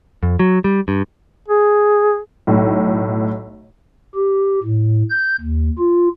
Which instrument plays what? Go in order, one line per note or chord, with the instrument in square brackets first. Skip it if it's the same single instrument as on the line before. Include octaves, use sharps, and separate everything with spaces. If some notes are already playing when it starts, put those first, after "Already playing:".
[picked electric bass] F2
F#3
G3
G2
[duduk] G#4
[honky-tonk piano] B1 A2
[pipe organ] G4
A2
G6
D#2
F4